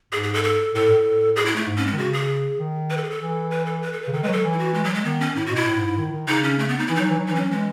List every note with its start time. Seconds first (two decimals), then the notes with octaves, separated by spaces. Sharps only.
0.12 G#2 G#4
0.23 G#4
0.34 A4
0.44 A4
0.75 A2 A4
0.90 A2
1.36 G#4
1.46 E4
1.56 A3
1.67 G#2
1.77 G#2 C#4
1.87 G#3
1.93 D#3
1.98 C#3 F#4
2.13 G#4
2.59 D#3
2.90 B4
2.97 A4
3.04 G#4
3.10 A4
3.20 E3
3.51 B4
3.66 A4
3.82 B4
3.93 A4
4.02 B4
4.07 C#3
4.13 D#3 A4
4.23 G#3 B4
4.28 F#3
4.33 A4
4.44 E3
4.53 E4
4.59 F#4
4.74 G#3
4.84 F#3
4.94 G#3
5.04 D#3 B3
5.20 C#4
5.36 A2 E4
5.46 F#4
5.51 B2 E4
5.67 A2
5.77 G#2
5.87 G#2
5.98 D#3
6.12 D#3
6.28 C#3 D#4
6.44 C#4
6.59 A3
6.69 B3
6.79 D#4
6.87 E3 E4
6.95 F#3 D#4
7.10 E3
7.19 F#3
7.27 E3 D#4
7.35 F#3 C#4
7.50 E3 G#3